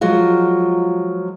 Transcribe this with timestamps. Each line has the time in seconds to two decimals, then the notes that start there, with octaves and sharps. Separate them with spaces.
0.01 F3 F#3 G#3 F4